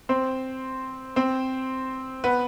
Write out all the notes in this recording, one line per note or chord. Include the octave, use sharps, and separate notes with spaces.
C4 C5
C4 C5
B3 B4